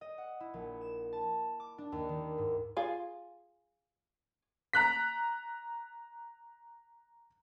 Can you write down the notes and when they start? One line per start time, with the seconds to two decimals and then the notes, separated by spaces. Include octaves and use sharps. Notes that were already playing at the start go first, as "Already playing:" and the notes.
0.01 D#5
0.18 F#5
0.40 E4
0.54 A#1
0.81 E7
1.13 A5
1.60 D6
1.78 D4
1.92 D#2
2.09 D#3
2.38 G#2
2.77 F4 G#4
4.73 A#5 F#6 B6